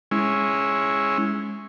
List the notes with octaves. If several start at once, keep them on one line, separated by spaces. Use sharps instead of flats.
G#3 C#4 E4